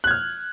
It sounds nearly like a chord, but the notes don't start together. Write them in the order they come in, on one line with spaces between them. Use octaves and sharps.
F#6 G#6 F6